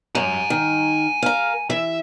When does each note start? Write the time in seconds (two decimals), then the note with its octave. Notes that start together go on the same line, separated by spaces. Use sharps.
0.15 F#2 G#5 A#5
0.50 D#3
1.22 A#4 F5
1.70 E3 E5